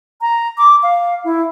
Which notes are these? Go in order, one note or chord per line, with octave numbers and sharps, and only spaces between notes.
A#5
D6
F5
E4